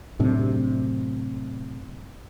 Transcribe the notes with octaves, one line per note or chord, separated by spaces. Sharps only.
F#2 A2 C3 D4